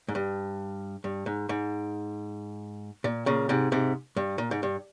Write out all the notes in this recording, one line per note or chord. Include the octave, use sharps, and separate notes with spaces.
G#2
G2
G2
G#2
G#2
A#2
A#2 C#3
G#2 C3
G#2 C3
G2
A#2
G#2
G2